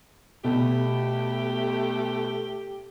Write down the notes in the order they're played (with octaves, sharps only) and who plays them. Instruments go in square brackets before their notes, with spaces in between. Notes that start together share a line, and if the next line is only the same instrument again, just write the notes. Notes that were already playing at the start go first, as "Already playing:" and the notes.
[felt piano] B2 [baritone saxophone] A3 [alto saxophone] G4